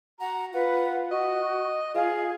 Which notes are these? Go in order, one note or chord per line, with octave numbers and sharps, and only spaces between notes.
F#4 F#5 A#5
F4 B4 F#5
F#4 D#5
F4 G#4 F5